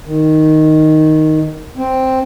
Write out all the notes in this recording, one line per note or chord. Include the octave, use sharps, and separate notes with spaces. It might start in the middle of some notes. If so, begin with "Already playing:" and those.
D#3
C4